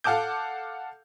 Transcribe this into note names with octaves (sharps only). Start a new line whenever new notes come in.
A4 F5 F#5 A5 D6 G6